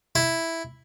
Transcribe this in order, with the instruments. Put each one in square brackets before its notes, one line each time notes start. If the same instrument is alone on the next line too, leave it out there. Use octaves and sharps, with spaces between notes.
[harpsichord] E4